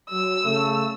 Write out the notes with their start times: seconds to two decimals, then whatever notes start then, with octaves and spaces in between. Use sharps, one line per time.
0.10 F#3 E6
0.45 C#3 A3